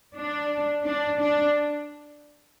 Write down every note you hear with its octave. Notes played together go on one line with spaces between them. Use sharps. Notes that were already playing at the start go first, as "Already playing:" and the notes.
D4
D4
D4